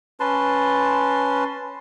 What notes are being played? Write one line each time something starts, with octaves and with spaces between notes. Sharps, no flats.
C#4 B4 A5 C6